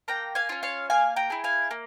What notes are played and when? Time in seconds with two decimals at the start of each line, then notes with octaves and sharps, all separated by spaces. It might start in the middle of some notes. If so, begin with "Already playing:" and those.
0.08 A#3 G5 A#5
0.35 F5 G#5
0.49 C#4 F4
0.63 C#5 F5
0.90 A#3 F5 G#5
1.16 G5 A#5
1.30 E4 G#4
1.44 F5 G#5
1.71 A#3